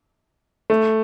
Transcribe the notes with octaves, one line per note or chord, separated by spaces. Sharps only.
A3